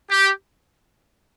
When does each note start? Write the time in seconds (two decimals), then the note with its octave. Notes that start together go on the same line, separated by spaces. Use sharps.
0.09 G4